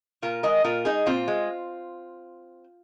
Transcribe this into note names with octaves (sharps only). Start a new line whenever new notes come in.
A#2 F4 A#4
G#3 A#4 D#5
A#2 F4 A#4
G#3 D#4 G#4
A#2 C4 F4
G#3